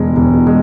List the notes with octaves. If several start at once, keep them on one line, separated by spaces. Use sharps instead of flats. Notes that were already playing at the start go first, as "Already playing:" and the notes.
Already playing: E1 G#3
E1
G#3